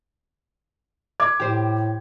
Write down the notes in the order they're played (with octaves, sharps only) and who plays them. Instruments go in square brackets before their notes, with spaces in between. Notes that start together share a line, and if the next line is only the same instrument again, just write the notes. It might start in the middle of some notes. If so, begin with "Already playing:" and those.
[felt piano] D6 G#6
[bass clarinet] A2 [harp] G4 C5